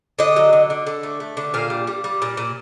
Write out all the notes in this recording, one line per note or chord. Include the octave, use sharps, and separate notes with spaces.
D3 D#5
F#3
D3
D3
D3
A3
A3
D3
A#2 F5
G3
G3
G3
A#2
A#2